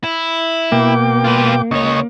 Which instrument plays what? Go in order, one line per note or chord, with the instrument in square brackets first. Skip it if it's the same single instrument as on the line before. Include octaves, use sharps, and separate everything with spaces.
[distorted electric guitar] E4
[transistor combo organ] B2 G5 D6 [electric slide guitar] A#3
[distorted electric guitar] F4 B4
[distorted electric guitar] C#2 C#5 [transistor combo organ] D#5 C#6